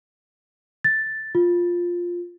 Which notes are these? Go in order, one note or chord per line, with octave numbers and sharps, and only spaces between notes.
A6
F4